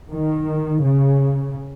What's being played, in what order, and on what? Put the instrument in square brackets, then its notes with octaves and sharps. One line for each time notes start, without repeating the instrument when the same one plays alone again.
[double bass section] D#3
C#3